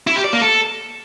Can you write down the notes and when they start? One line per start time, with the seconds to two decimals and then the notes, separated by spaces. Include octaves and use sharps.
0.07 E4
0.16 G4
0.24 D5
0.33 A#3
0.42 A4